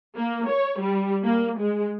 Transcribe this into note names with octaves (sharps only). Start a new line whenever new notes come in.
A#3
C#5
G3
A#3
G#3